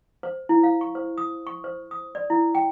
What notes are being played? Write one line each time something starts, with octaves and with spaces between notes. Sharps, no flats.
C5
E4
F5
C#6
C5
D#6
C#6
C5
D#6
D5
E4
G5